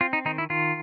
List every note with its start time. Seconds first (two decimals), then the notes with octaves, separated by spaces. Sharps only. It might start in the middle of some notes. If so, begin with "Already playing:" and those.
0.01 C4 F4
0.13 D#4
0.25 D#3 D#4
0.38 E4
0.50 D#3 F4